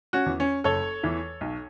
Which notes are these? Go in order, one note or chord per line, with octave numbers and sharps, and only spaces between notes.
C#4 F#4
E2 E3
C#4
F#1 A4 C#5
E2 E3
B1